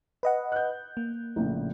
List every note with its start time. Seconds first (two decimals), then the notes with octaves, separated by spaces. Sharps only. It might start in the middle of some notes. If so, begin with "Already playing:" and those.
0.23 B4 D#5 F#5
0.52 F#6 G6
0.97 A#3
1.36 A#1 A2 C#3